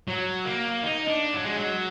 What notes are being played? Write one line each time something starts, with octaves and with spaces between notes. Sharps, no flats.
F#3
A#3
D#4
D4
F#3
G#3
F#3